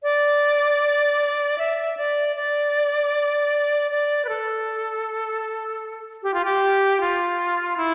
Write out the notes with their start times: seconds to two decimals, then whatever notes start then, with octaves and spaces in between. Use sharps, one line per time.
0.03 D5
1.58 E5
1.97 D5
2.36 D5
3.91 D5
4.25 B4
4.29 A4
6.23 G4
6.34 F4
6.45 G4
7.01 F4
7.77 E4